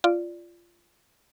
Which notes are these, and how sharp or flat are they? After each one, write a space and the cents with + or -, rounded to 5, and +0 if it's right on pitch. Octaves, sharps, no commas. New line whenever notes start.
F4 -15 D5 +0